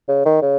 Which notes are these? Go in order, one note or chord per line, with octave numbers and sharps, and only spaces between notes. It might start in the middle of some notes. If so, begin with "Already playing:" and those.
C#3
D#3
C#3